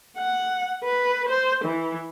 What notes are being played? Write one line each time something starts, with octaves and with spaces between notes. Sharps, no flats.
F#5
B4
C5
E3